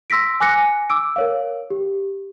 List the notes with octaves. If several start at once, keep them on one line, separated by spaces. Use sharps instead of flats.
C6 E6 A#6 B6 D7
G#5 D6 F#6 A#6 C#7
D6 E6 D7
A#4 C#5 F5
G4